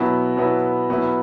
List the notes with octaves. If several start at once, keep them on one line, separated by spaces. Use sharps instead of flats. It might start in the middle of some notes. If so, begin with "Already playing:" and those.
Already playing: B2 F#3 B3 E4
B2 F#3 B3 E4
B2 F#3 B3 E4